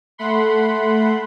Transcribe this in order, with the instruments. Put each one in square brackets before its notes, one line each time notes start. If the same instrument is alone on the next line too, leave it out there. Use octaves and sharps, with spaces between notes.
[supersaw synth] A3 F#5 B5 C6